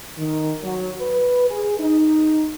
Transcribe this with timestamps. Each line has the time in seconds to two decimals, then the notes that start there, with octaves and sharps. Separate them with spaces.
0.18 D#3
0.63 F#3
1.01 B4
1.49 G#4
1.80 D#4